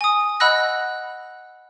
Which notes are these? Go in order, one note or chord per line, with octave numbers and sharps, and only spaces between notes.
G#5 D#6
D#5 F#5 B5 E6 F#6 A#6